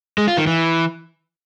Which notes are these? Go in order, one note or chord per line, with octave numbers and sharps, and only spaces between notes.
G#3
F4
D#3
E3